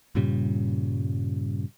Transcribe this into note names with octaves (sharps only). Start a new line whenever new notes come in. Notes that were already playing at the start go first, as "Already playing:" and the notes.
G2 A#2 C#3 G3